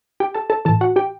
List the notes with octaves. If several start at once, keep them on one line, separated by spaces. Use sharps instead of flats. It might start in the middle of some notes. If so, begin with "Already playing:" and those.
G4 G5
A4 A5
A4 A5
A2 E3 A4 A5
F#4 F#5
G4 G5